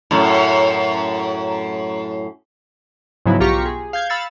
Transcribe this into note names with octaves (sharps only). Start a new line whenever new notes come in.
F#2 A2
G#2 C#3 F3 F#3 B3 E4
B1 F4 G4 A#5 C#6 B6
G#4
F5 G6 G#6
F5 B5 E6 F6 A6 C#7